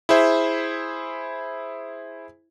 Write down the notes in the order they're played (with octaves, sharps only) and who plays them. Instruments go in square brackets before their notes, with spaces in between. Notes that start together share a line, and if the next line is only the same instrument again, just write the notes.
[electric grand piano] E4 G#4 C5 E5